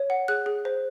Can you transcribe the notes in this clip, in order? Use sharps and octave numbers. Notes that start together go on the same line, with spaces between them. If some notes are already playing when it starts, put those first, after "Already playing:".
Already playing: C#5
F#5
G#4 F#6
G#4
C5